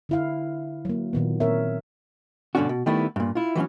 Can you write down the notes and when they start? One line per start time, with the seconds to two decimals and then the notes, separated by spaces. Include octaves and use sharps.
0.09 D3 E4 F5
0.85 F#3 A#3
1.13 A#2 D#3 B3
1.40 A#2 C4 A#4 C#5 E5
2.55 G2 B2 D3 C#4 D4 F#4
2.69 B2
2.86 D#3 G3 A3 B3 E4
3.16 G2 A#2
3.35 E4 F4
3.55 E3 F#3 C4 C#4